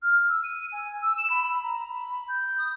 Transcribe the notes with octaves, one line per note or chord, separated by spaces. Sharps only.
F6
E6
D#7
G#5
E6
E7
B5
B5
A#5
B5
G6
D#6